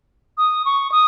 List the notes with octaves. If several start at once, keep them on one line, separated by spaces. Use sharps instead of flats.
D#6
C#6
D#6